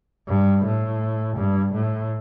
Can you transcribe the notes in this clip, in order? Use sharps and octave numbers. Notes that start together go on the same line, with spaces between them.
G2
A2
G2
A2